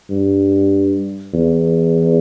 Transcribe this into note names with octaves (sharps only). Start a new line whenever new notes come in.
G2
E2